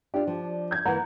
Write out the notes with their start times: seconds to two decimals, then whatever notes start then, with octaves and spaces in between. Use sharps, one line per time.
0.14 D4 F4 G4
0.27 F3
0.71 G6 G#6
0.85 E3 A#3 F#5 A#5